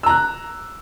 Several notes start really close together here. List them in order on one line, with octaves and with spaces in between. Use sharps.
E6 A#5 F#6